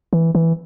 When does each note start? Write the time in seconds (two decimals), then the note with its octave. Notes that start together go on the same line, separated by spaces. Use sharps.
0.13 E3
0.35 E3